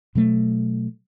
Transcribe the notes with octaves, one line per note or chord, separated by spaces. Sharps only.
B2 F#3 A3